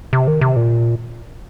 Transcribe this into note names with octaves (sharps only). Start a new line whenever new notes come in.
C3
D#3
C3
A#2